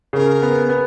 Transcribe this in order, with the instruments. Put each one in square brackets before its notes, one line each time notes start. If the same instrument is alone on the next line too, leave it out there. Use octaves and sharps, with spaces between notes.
[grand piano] C#3 [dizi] A#4
[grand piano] B3
B3